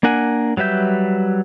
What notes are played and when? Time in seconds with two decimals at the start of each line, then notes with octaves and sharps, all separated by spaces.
0.03 A#3 D4 A#4 F#5 G#5
0.57 F#3 G3 B4 E5 G6